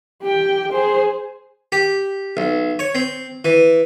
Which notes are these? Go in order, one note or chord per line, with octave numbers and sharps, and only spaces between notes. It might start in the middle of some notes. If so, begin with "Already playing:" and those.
G4 G5
G#4 C5
G4
B1
C#5
C4
E3